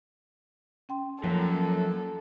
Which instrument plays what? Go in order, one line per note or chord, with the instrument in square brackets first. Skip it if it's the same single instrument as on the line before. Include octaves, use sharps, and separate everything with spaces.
[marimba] C#4 G5 C6
[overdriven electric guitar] F#2 [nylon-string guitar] F3 A#3 [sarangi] A4